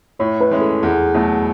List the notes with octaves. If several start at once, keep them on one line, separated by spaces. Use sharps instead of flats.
A2 C#5
B4
E3 G#3 C#4
A4
E2 G#4
B2 F#3 A3